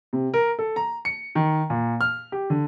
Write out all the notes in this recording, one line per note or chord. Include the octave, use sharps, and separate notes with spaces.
C3
A#4
A4
A#5
C#7
D#3
A#2
F6
G4
D3